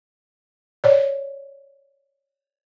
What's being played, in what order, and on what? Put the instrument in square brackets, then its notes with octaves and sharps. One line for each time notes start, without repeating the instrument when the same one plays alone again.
[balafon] C#5 D5